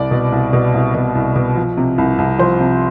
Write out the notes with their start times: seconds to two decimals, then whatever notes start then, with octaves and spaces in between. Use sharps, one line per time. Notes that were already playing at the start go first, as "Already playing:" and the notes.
Already playing: C2 D5
0.11 B2
0.32 C2
0.53 B2
0.74 C2
0.95 B2
1.15 C2
1.36 B2
1.56 F3
1.77 C3
1.98 C2
2.18 C2
2.39 F3 C5
2.60 C3